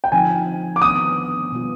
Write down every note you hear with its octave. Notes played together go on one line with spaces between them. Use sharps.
G5
D3 F3 C4 D#4 G#5
D6
D#3 B3 D4 D#6
B2 G3 B3 F4